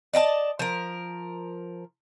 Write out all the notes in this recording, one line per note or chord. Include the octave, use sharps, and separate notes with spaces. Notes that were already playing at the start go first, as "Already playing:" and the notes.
D5 D#5 G5 A5
F3 A#4